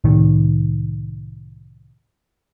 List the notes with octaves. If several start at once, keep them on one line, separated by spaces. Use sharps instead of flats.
C2 A2 C3 D#3